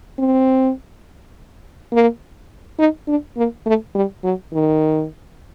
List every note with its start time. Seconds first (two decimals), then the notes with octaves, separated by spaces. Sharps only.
0.19 C4
1.93 A#3
2.79 D#4
3.08 D4
3.37 A#3
3.66 A3
3.95 G3
4.24 F#3
4.53 D#3